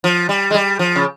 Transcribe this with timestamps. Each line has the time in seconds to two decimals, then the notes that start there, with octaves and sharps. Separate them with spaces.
0.04 F3
0.29 G3
0.51 G#3
0.54 G3
0.79 F3
0.96 C#3